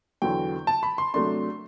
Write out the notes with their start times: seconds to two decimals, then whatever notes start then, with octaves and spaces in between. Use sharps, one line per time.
0.22 E2 D3 F#3 G5
0.67 A5
0.83 B5
0.98 C6
1.14 C3 F#3 A3 D4 C6